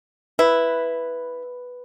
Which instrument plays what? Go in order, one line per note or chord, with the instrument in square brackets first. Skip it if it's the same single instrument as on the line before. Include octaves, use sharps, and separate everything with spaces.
[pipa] E4 [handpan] B4